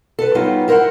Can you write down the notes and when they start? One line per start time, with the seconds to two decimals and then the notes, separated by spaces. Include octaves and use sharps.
0.19 A4 B4
0.35 F#3 G3 B3 D#4 F4
0.68 E4 A#4 C5 E5 F#5